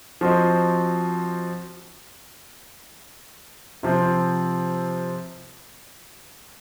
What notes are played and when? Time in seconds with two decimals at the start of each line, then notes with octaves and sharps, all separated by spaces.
0.21 F3 C4 F#4 C5 D#5
3.83 C3 F3 C4